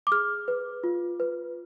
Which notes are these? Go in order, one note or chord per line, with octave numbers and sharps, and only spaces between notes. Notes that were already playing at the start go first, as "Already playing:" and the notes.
D6
G#4 F6
B4
F4
B4